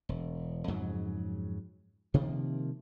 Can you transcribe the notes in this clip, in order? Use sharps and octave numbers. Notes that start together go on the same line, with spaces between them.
E1
F2 G#2 C#3 F#3
C3 D#3 F3 A#3